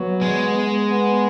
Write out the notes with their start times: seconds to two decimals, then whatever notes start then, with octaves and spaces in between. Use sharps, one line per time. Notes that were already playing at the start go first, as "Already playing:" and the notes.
Already playing: F#3 B3
0.21 G#3
0.90 B3